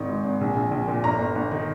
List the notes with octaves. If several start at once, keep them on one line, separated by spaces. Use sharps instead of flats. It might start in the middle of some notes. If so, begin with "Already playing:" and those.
Already playing: G#1 D#3
G#2
G#1
A#1
A#1
A#1
A#2
G1 A#5
G1
G1
D#3